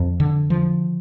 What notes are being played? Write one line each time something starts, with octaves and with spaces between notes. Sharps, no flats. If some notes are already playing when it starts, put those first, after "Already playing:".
Already playing: F2
D3
F3